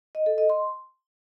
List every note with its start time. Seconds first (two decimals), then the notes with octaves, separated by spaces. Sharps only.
0.15 D#5
0.26 A4
0.38 D#5
0.50 C6